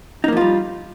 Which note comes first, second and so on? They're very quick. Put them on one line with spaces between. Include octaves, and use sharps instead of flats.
D#4 A#3 F3 F4 G3